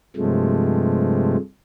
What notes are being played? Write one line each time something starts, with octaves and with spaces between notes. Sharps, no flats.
G2 C3 F3 G#3 A3